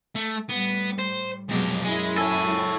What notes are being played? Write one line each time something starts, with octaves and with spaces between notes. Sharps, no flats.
A3
A2 G3 B3
C5
F2 B2 F#3 G#3 G4
F#2 F#3 G#3 E4 G#4
A4 C#5 G#5